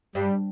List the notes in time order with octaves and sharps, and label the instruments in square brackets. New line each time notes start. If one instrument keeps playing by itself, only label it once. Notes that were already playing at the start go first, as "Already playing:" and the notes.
[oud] G2 [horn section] G3